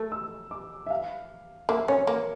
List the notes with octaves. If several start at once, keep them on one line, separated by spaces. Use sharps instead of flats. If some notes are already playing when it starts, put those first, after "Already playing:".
Already playing: A3
E6
D6
E5
F5
A#3 E5
C#4 C#5
A#3 A#4